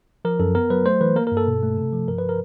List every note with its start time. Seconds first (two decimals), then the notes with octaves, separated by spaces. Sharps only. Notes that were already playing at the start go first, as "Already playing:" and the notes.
0.25 F3 A#4
0.39 F#2 A4
0.55 B3 A#4
0.70 F#3 B4
0.85 A3 C5
1.01 E3 B4
1.16 A#3 A#4
1.27 A#4
1.31 G2
1.37 A4
1.47 B2
1.63 A3
1.78 C3
1.93 F3
2.08 G2 A#4
2.18 B4
2.29 A#4